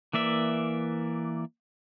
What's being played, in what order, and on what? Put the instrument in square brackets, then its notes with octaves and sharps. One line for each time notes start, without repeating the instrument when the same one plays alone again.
[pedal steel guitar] E3 A#3 D5 E5